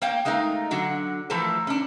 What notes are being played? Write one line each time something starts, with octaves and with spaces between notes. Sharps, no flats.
A#3 C#5 F5 G5
G#3 A3 D#4 A#4 F5
D3 F#3 F#4
E3 F3 A3 A4 A#4 C5
C#4 D4